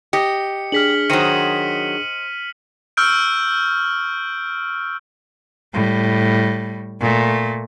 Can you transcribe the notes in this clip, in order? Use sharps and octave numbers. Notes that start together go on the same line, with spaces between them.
G4 D#5 C#7
D4 G#4 F6 B6 F#7
D#3 F#3 C5 D#5 G5 C#7 D#7
C#6 E6 F6 G6 D7
A2 G3
A#2 A3